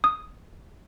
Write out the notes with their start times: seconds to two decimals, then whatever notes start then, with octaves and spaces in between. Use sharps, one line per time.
0.04 D#6